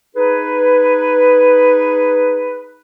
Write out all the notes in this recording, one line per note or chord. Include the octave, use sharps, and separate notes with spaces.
D#4 G#4 B4